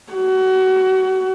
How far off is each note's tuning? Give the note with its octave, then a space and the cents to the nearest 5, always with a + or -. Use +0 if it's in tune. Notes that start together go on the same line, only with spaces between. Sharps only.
F#4 +30